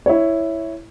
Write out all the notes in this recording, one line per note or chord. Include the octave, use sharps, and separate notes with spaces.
E4 C#5